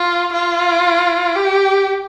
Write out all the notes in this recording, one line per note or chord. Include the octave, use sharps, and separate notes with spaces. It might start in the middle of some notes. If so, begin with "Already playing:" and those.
Already playing: F4
F4
G4